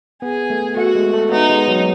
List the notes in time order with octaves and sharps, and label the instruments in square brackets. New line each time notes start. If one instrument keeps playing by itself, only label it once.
[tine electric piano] B3 [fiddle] G#4
[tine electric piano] A3
[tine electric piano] A3 [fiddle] F#4
[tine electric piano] G#3
A3
[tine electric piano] B3 [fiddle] D#4
[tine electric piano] G#3
F#3